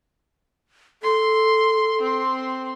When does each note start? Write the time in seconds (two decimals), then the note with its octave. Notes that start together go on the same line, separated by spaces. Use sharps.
1.03 A4 C6
2.01 C4 C6